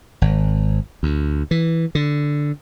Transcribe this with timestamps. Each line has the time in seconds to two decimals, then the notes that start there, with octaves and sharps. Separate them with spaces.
0.22 G#1
1.03 D2
1.51 E3
1.95 D3